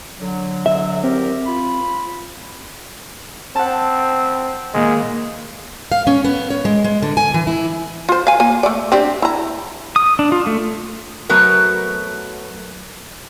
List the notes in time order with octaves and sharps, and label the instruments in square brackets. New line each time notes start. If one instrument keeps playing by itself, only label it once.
[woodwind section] D3 F#3
[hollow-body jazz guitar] E5
[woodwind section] E2 G4 A#4 [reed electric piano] C4
[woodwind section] F4 B5
[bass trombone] C4 [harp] F#5 A5
[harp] A#2 D#3 [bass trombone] G#3
[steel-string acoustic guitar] F5
C#4
B3
C#5
G#3
G#3
D3
G#5
E3
E4
[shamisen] F4 C5
F5 G#5
A#3 G#5
A3 D5
C4 D4 G4
E4 A#5
[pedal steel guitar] D#6
D4
F4
A3
[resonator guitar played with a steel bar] F#3 A3 B3 F#4 A#4